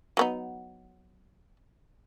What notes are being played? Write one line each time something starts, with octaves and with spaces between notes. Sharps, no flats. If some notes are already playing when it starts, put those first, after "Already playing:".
F#3 B3 D#4